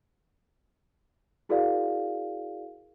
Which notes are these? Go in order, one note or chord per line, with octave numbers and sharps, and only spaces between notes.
E4 F#4 G#4 A#4 D5 F5